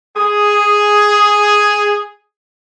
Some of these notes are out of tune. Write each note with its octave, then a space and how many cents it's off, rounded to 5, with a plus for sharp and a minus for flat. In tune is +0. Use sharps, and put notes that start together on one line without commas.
G#4 +0